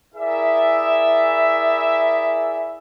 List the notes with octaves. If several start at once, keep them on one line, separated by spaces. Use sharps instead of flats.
E4 G#4 A#4 D5 E5